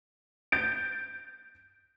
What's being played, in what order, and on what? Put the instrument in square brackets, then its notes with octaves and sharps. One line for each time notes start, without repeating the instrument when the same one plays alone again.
[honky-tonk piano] G6 A6 D7